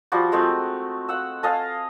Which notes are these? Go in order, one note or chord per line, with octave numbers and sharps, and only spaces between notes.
F3 G3 F#4
G#3 A3 C4 F#4
F5 F#5 E6
A4 D#5 F5 G#5